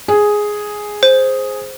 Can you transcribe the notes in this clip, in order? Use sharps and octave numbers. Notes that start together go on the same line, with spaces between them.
G#4
C5